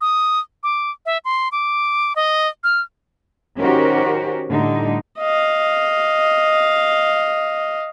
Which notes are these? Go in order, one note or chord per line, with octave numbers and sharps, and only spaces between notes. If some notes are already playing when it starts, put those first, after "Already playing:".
D#6
D6
E5
C6
D6
D#5
F6
D#3 C#4 F#4 G4 A#4 C5
A2 D3 G3 D#4
D#5 F5